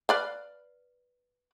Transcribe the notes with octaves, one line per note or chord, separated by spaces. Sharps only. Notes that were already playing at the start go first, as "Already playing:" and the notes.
B4 D5 F5